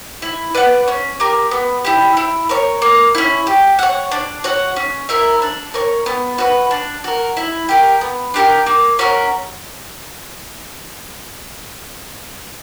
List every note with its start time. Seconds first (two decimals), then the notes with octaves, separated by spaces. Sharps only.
0.22 E4
0.54 B4 D5 F#5
0.88 C#4
1.20 G4 A#4
1.51 B3
1.85 E4 G4
2.17 E4
2.49 A#4 C#5
2.82 A#3
3.15 C#4 E4
3.47 G4
3.79 C#5 F#5
4.12 D4
4.44 F#4 C#5 F#5
4.76 C#4
5.09 E4 A#4 E5
5.42 D4
5.74 A#4 C#5
6.06 B3
6.38 F#4 B4
6.71 D4
7.04 F#4 A#4
7.37 E4
7.69 G4 A#4
8.01 B3
8.34 D4 G4 A#4
8.66 A#3
8.99 C#4 F#4 A#4